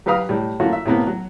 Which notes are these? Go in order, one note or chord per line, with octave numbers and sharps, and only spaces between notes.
F#3 G4 B4 F5 A#5 D#6
A2 G3
F#3 A3 A#3 C#4 F4 F#4
E5
A2 C3 A#3 B3
F#3